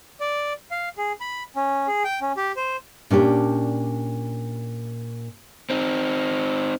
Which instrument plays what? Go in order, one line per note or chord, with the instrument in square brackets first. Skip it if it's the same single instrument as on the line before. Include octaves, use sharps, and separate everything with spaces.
[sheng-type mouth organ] D5
F5
G#4
B5
C#4
G#4
G5
C#4
G4
C5
[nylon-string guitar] A#2 C#4 D4 G4
[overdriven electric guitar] C4 D#4